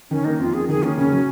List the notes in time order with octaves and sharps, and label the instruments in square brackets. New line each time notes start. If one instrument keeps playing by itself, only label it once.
[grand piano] D#3 [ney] C#4
[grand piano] A#3 [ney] D#4
[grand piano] F2 [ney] F4
[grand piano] F2 [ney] G#4
[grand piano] D#3 [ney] G#4
[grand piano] A#3 [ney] C#4
[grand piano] C#3 [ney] C#4
[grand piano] F#3